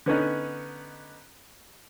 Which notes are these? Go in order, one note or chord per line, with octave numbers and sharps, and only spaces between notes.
D3 B3 C#4 D#4